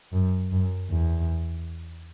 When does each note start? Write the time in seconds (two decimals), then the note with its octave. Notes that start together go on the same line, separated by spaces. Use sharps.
0.13 F#2
0.52 F#2
0.91 E2